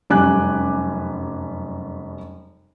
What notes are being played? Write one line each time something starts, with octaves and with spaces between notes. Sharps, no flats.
F1 F#2 G3 G#5 D6 F#6